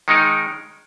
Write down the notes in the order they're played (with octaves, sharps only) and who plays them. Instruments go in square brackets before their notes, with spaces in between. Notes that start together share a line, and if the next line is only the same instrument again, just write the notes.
[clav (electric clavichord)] D#3 G#3 D#4 A#4